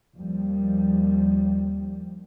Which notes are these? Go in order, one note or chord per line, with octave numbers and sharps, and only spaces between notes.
D#2 F3 G3